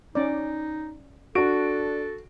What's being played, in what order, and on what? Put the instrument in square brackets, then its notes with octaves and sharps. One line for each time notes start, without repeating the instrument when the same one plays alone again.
[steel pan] C#4 D5 [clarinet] D#4
[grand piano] D4 D7 [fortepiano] F#4 [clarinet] A4